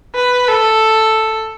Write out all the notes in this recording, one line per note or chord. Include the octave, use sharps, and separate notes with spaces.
B4
A4